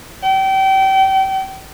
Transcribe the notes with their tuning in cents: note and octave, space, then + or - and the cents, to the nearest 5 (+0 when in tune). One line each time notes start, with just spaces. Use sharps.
G5 -30